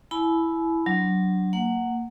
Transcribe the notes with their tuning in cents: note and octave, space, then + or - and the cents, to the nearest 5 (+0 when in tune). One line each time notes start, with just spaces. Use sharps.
E4 +0 G#5 +40 B5 +0
F#3 +10 D4 +0
A#3 -15 F#5 +0